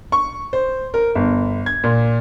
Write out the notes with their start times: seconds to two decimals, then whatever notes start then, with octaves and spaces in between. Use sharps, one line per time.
0.12 C#6
0.53 C5
0.94 A#4
1.15 G1
1.66 G#6
1.84 A#2